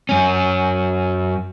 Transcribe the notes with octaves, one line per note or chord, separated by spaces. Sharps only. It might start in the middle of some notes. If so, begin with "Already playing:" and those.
F#2 C#4